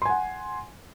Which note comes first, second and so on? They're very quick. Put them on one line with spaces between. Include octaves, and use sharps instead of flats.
C6 G#5 F#5